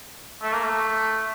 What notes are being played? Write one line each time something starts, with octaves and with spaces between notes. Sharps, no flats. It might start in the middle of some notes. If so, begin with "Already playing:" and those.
A3
A#3
A3